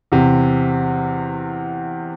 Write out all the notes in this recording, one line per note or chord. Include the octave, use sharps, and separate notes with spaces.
E2 C3